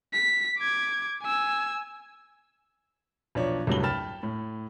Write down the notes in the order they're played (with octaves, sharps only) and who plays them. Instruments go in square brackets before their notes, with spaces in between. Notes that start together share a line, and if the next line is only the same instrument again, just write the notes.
[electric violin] B6
D6 G#6
G#5 E6
[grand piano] B1 F3 D4 C#5
C2 G2 C3 F#3 A3 G7
G5 A5 B5 F6 A6 E7
A2